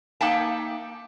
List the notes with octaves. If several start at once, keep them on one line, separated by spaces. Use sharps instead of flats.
A#3 D#4 E5 G5 A5